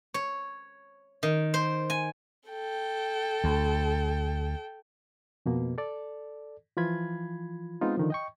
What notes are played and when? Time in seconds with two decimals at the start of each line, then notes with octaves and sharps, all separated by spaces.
0.14 C#5
1.23 D#3
1.54 C5
1.90 G#5
2.49 A4 G5
3.44 D2
5.46 F2 B2 A#3
5.78 A4 D5
6.77 E3 F3 F4 B5 G#6
7.81 G#3 B3 C4 D#4 F4
7.97 D3 D#3 F3
8.10 D#5 G5 C#6